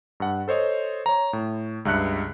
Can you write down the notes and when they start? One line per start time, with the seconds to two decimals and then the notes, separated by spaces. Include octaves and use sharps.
0.20 G2 F#5
0.48 A4 C5 C#5 D#5
1.06 C#5 A#5
1.33 A2
1.85 C#2 G2 E5 F#6 C#7